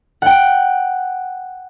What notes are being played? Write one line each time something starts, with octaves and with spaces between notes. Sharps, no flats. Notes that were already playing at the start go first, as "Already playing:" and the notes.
F#5 G5